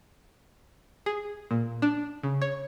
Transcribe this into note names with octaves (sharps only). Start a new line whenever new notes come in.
G#4
A#2
D4
C#3
C#5